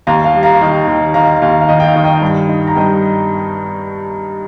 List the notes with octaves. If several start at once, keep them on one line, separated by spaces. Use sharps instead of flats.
D#2 F5 A#5
F5
G3
F5 A#5
D#3
D#2
D#3 F5 A#5
D#2 F5
F5
D#3 D#5
G5
F5
D#3
D#5 G5
G2
D#4
A#5
G2 D#5 G5